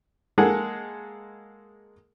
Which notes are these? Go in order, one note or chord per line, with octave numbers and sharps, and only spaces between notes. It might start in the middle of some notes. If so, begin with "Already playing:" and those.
G#3 A#3 G#4 A4 F#5